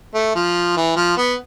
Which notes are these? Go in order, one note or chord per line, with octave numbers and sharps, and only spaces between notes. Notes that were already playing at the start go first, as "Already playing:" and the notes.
A3
F3
E3
F3
B3